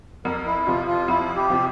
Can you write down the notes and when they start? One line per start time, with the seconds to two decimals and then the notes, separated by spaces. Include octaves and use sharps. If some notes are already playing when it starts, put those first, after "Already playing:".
0.25 F2 A#4
0.46 E4
0.67 C3 F3 F4
0.87 F4
1.08 F2 E4
1.36 G4
1.50 C3 F3